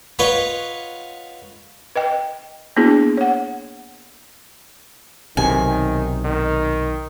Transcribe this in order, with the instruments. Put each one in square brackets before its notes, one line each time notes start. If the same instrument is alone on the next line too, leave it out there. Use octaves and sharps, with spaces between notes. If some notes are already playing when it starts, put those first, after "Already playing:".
[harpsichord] F4 B4 C#5 D#5 F#5
[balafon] B4 D#5 G5
A#3 B3 D4 E4 F#4 G#4
C#5 F#5
[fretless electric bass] B1 C3 [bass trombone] D#3 [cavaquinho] G#5
[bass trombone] D#3